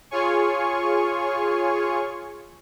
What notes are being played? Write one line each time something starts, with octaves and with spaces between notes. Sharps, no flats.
F4 G#4 C#5 G#5 C#6